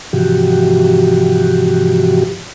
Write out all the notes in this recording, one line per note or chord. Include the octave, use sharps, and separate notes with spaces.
G#2 C3 E3 F3 F#4 G4